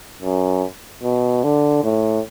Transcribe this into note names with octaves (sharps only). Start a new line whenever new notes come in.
F#2
B2
D3
A2